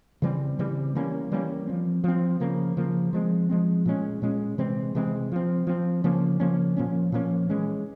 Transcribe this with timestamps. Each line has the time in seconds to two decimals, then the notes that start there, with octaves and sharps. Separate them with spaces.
0.22 C#3 E3 G3 C4
0.59 C#3 E3 G3 C4
0.95 E3 G3 A#3 C#4
1.32 E3 G3 A#3 C#4
1.67 F3 C4
2.04 F3 C4
2.40 C#3 F3 A#3
2.77 C#3 F3 A#3
3.13 F3 G#3 C4
3.49 F3 G#3 C4
3.85 A#2 G#3 C#4
4.22 A#2 G#3 C#4
4.58 C3 E3 G#3 C4
4.95 C3 E3 G#3 C4
5.32 F3 C4
5.67 F3 C4
6.04 C#3 F3 A#3 C#4
6.40 C#3 F3 A#3 C#4
6.76 A#2 F3 A#3 C#4
7.12 A#2 F3 A#3 C#4
7.49 E3 G#3 C#4